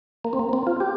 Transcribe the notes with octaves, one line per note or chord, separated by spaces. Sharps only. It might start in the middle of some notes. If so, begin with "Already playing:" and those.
A#3
C4
A#3
C4
F4
G4